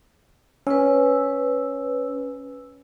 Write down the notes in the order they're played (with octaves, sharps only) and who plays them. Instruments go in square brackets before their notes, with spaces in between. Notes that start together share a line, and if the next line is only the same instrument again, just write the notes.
[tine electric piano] C#4 [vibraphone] B4 E6